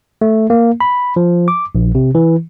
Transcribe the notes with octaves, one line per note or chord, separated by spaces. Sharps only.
A3
A#3
B5
F3
D6
A#1
C3
E3